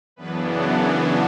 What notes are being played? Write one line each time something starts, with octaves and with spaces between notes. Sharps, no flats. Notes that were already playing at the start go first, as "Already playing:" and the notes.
F#2 C#3 E3 B3 D4 B4
F#4